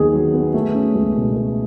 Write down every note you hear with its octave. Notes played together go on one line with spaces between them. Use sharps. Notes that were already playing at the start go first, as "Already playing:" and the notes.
Already playing: D#2 D#3 F#3 B3 G#4
F#3
B3
A3
C#4
C#2
B2
A3